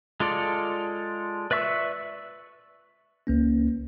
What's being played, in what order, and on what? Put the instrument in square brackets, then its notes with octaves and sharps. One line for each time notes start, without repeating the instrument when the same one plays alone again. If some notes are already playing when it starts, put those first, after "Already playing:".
[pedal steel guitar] G#3 F4 A4 D5
B4 D5 E5 C#6 E6
[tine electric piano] C#2 A#3 C#4